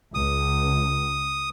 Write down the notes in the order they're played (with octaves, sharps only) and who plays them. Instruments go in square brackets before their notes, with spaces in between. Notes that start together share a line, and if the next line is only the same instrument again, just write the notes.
[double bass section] C#2 [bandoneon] D#6